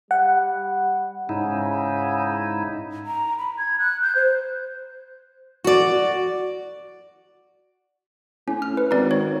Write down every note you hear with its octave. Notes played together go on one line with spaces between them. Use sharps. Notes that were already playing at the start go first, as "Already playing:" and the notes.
G3 F#5
G#2 C#3 D#4 E4
A#5
B5
G#6
F#6
G6
C5
F#4 D5
A2 C#4
F6
B4
G#1 D#4 D5
C#5